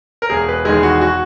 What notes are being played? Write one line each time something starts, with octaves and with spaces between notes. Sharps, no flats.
A#4
E1 G#4
B4
E2 D#3 G#3 G#4
F#4
F#4